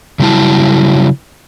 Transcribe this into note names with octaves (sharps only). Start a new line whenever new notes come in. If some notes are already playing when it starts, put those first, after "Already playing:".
C#3 F#3 G3 E4 A5